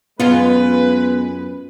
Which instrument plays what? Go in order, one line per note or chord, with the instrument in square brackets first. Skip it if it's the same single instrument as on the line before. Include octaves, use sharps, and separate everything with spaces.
[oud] F#2 C#4 F4 [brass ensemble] G#3 B4 [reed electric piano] B3